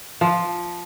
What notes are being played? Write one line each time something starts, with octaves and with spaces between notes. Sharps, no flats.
F3